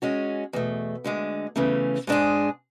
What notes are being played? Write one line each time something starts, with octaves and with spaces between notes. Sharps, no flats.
G#3 C#4 F#4
E2 B2 A3
D2 D3 G#3
E2 C#3 E3 A3 C#4
G#2 G#3 D4 G#4